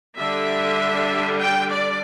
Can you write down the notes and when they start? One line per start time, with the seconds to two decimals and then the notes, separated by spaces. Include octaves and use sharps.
0.17 D3 G3 D4 E5
1.37 G5
1.68 D5